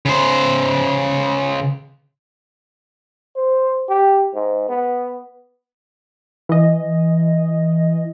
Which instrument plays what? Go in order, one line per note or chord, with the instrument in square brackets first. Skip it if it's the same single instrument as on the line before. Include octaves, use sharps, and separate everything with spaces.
[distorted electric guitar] C#3 C5
[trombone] C5
G4
G#2
B3
[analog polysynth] E3 D#5